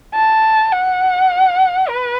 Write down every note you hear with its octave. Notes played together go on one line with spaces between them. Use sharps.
A5
F#5
B4